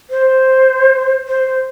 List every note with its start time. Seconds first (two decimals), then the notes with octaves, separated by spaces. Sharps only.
0.10 C5
1.27 C5